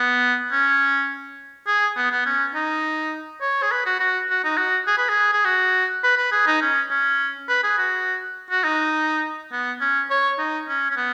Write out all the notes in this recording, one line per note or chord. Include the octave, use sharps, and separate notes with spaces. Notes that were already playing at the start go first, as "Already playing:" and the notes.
Already playing: B3
C#4
G#4
B3
B3
C#4
D#4
C#5
G#4
B4
F#4
F#4
F#4
D#4
F#4
G#4
B4
G#4
G#4
F#4
B4
B4
G#4
D#4
C#4
C#4
B4
G#4
F#4
F#4
D#4
B3
C#4
C#5
D#4
C#4
C#4
B3